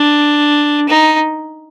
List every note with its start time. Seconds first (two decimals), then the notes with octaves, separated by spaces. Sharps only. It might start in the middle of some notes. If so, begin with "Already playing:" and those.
Already playing: D4
0.89 D#4